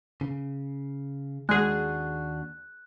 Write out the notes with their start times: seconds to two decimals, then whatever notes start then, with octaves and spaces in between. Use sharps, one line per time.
0.21 C#3
1.49 D#2 G#3 D4 F#4 G#4 F#6